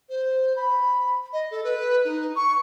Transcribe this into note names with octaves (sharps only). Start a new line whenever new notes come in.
C5
B5
D#5
A4
B4
D#4
C#6